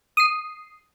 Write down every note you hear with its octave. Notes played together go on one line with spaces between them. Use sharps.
D#6 C7